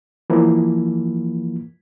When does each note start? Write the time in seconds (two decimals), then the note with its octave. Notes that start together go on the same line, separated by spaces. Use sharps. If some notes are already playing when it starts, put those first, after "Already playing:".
0.30 E3 F3 A#3